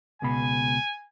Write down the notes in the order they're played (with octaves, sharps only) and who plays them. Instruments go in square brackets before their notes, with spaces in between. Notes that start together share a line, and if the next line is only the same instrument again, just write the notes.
[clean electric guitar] C#2 B2 B5 [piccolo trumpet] G#5